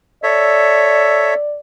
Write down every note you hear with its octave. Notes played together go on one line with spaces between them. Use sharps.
A4 C#5 D5 E5